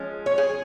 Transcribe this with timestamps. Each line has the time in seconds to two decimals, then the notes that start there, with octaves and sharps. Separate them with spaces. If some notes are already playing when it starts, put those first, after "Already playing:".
Already playing: F3 G#3 C#4
0.26 C#5
0.38 G#4